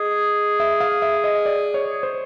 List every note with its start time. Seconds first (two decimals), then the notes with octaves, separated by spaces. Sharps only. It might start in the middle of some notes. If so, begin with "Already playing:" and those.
Already playing: G#4 D#5
0.60 E5
0.80 F5
1.02 E5
1.24 D#5
1.46 D5
1.74 C#5
2.03 C5